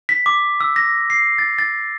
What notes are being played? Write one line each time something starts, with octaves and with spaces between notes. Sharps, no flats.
B6
D6
E6
A#6
C7
A6
A6